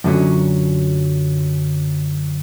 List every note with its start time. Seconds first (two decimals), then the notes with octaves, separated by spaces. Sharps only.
0.04 F#2 A#2 D3 E3 F#3 C#4